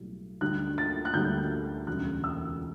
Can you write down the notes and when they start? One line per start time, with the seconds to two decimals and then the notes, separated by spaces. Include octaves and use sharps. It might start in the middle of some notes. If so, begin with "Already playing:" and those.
Already playing: B1 A2 G3
0.41 D2 D3 G3 F#6
0.78 A6
1.05 F#6
1.14 D2 D3 G3 G6
1.87 E1 D2 C#3 G3 F#6
2.24 E6